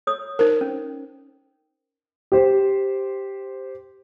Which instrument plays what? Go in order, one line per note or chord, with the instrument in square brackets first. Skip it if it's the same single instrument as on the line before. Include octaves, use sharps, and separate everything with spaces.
[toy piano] C#5 D#6
[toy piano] D#4 C5 [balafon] A#4
[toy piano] C#4
[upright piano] G4 C5